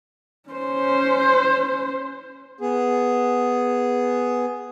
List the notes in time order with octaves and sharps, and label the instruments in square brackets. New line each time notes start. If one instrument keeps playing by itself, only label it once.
[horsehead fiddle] C#4 C5
[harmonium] B3 G#4